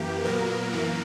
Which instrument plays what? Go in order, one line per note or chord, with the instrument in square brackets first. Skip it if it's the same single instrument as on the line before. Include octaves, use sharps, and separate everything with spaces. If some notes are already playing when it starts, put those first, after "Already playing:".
Already playing: [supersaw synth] F#2 E3 A#3 G4
A#2 F#3 A#3 B3 A#4
F#2 E3 A#3